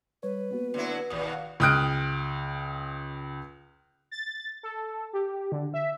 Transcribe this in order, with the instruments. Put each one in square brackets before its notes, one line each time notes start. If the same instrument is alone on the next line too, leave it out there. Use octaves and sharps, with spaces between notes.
[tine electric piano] G3 C#5 [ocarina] B4
[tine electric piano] A#3 B3 F#4
[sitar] D3 F#3 E4
[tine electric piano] A1 D#6 [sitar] D#2 B2
[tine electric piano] F5 F#5 F#6
[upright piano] C#2 G5 D#6 F6 F#6 D7
[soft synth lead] A6
A4
G4
D3
E5